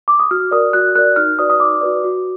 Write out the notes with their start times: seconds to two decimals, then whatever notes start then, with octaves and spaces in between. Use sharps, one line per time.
0.08 D6
0.20 D#6
0.31 F#4 F6
0.51 A#4 D5 D#6
0.73 F#4 F#6
0.95 A#4 D5 F#6
1.16 D#4 F6
1.39 F#4 B4 D5 D#6
1.50 D#6
1.60 D#4 D6
1.81 F#4 B4 D5
2.04 F#4